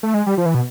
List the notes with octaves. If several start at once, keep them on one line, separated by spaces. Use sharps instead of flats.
A3
G#3
G3
F3
E3
B2